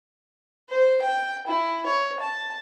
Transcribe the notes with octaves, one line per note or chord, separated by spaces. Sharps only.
C5
G5
E4
C#5
A5